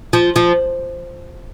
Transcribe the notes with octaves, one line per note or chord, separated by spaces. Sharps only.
F3
F3